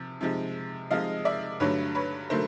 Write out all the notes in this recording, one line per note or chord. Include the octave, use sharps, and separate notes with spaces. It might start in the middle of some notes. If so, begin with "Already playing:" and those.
Already playing: C3 F3
C3 F3 G#3
C3 F3 G#3 D#5 F5
D5 E5
G2 D3 F#3 A3 B4 C#5
B4 C#5
D3 F#3 A3 A#4 C5